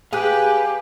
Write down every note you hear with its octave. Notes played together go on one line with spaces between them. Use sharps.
G4 G#4 B4 F5 G#5 F#6